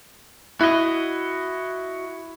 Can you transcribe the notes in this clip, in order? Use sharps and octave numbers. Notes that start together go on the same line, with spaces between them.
E4 F#4 D#5